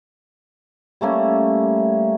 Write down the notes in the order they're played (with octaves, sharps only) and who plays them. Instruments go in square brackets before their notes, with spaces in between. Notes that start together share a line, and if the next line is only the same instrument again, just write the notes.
[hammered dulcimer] G3 A3 A#3 C#4